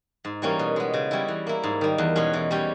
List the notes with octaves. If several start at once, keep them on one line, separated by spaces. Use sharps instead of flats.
G#2
E3 G3 A#3 C#4
B2
G#3 B3
C#3
G3 C#4 E4
E3
A#3 E4
G#2
D#3 G3
E2
B2 G#3 C#4
E3
G3 C#4 G4